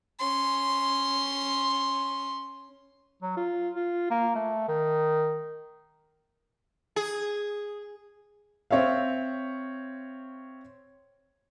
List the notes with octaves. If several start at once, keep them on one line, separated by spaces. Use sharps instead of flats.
C#4 C6
F#3
F4
F4
A#3
A3
D#3
G#4
C4 C#5 E5 F5